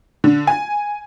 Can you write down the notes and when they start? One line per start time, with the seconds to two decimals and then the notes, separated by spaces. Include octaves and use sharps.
0.24 D3
0.47 G#5